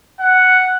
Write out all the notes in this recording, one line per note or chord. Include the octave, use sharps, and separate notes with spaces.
F#5